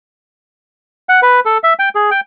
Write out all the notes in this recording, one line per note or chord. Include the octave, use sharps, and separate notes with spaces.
F#5
B4
A4
E5
G5
G#4
G5